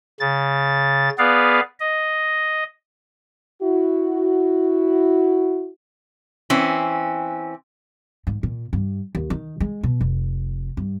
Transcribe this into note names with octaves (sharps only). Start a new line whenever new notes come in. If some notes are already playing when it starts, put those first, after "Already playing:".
C#3 A6
B3 G#4 B4 D5 F5
D#5
E4 F#4
E3 C4 C#4
G#2
A#2
G2
D#2
D#3
G#3
B2
F1
G2